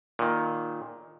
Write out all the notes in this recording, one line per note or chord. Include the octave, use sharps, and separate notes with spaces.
A#2 D#3